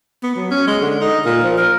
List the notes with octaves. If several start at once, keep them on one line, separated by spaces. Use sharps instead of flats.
B3
F#3
C#4
G#3
D3
D#4
A#2
F3
A#4